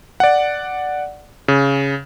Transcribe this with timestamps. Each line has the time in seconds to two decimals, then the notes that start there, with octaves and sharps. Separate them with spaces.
0.20 D5 F#5
1.48 C#3